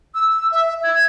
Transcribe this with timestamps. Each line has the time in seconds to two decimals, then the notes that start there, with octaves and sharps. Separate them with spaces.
0.15 E6
0.52 E5
0.84 G#6